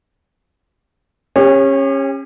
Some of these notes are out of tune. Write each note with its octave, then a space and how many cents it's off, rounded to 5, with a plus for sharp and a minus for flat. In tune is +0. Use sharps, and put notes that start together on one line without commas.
C#4 -20 G4 +40